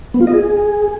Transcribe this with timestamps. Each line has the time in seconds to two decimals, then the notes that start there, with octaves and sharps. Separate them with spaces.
0.14 B3
0.21 F4
0.27 D#5
0.33 G#4